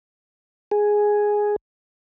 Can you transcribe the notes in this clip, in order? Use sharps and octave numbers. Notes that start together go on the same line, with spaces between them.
G#4